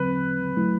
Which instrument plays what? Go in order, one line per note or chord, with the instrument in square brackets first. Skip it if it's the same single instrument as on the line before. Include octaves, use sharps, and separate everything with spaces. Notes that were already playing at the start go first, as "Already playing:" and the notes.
Already playing: [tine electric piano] D3 F#3 C4 [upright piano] B4
[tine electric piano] F#3 A3 E4